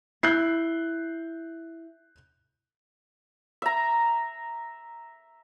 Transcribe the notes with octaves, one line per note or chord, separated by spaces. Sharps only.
E4 F#6 G6 C7
E5 A#5